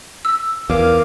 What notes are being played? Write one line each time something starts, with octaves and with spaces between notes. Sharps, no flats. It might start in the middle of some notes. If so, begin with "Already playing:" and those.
E6
E2 A#4 F5 D6